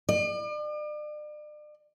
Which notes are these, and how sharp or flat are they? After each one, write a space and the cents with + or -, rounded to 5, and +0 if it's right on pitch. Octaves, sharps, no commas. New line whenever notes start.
D5 +40